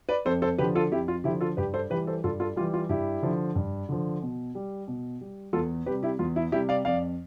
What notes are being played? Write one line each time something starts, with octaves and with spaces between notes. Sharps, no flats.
B4 D5
F2 A4 C5
A4 C5
D3 F3 G4 B4
F4 A4
F2 E4 G4
F4
D3 F3 E4 G4
F4 A4
G2 G4 B4
A4 C5
E3 G3 G4 B4
A4 C5
G2 F4 A4
F4 A4
E3 G3 F4
F4
G2 E4 G4
D3 F3
G2
D3 F3
B2
G3
B2
G3
E2 F4 A4
C3 G3 G4 B4
E4 G4
E2 F4
E4
C3 G3 E4 G4
D5 F5
F2 D5 F5